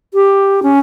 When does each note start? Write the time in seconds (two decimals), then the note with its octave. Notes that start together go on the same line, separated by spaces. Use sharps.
0.14 G4
0.63 C#4